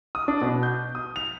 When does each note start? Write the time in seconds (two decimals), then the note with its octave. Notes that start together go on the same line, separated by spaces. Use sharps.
0.15 D#6
0.28 D4
0.42 B2
0.63 G6
0.95 D#6
1.16 F7